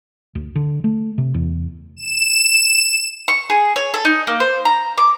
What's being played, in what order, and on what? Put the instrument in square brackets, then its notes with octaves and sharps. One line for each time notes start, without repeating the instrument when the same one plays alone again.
[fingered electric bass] D2
D3
A3
C3
E2
[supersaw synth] E7
[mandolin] C#6
G#4
C#5
A4
D#4
A#3
C5
A#5
D6